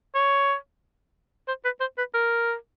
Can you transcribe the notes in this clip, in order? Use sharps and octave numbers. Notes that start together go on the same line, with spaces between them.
C#5
C5
B4
C5
B4
A#4